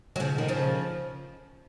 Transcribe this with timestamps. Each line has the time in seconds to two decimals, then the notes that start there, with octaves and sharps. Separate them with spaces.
0.16 F#3
0.20 C#3 F3
0.38 D#3
0.48 C#3 F3